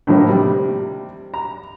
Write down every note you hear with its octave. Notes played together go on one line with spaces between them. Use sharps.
A2 D3 D#3 F3 A#3
C3 G3
A#5